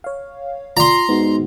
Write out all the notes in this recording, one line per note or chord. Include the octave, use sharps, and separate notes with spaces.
C#5 F5
F4 D5 A#5 C6
G#2 B3 F#4